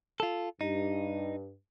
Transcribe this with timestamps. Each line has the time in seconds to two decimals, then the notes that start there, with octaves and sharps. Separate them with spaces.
0.20 F4 A4
0.61 G2 D#4